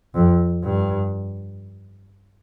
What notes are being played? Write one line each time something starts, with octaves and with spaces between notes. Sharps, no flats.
F2
G2